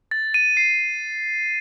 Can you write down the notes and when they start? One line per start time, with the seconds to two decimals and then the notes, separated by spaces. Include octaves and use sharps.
0.11 A6
0.34 D#7
0.57 C7